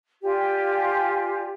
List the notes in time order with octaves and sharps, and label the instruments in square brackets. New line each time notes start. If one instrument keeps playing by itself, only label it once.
[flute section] F4 G4 D5 G#5